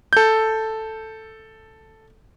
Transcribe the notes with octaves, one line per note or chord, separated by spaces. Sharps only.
A4 G6